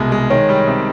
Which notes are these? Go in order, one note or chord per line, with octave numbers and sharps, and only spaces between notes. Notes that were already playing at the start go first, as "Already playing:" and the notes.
Already playing: C2 B2 G#3
G#3
D#3 C#5
G3
C3